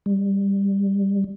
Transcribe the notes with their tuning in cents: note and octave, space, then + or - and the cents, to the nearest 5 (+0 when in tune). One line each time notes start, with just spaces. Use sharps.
G3 +15